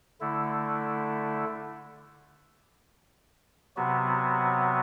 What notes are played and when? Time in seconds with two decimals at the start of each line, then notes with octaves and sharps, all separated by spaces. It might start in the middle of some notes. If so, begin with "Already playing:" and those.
0.20 D3 A3 E4
3.76 C3 F#3 B3 F#4